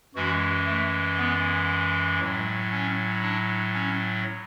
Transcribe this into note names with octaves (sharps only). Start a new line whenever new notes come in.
F#2 E3 G#3 F#4
A3
B3
A2 F#3
C#4
D4
C#4